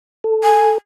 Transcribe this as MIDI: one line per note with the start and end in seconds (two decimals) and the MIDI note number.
0.24 0.78 69
0.43 0.70 80